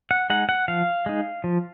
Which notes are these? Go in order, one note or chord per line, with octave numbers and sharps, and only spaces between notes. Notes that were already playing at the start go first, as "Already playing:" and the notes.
F#5
G#3 D#4 F#5
F#5
F3 F5
G#3 D#4
F3